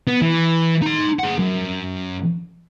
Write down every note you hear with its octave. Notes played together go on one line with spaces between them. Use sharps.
B3
E3
D#4 C6
G#4 F#5
F#2